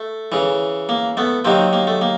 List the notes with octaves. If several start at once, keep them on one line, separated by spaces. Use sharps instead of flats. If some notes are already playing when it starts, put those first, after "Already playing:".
Already playing: A3
C#3 E3
A#3
A3 B3
C3 D#3 F#3 A#3 C4
A#3
A3
A#3